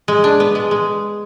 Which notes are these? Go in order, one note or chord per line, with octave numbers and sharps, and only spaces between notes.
G#3
D4
B3
G#3
G#3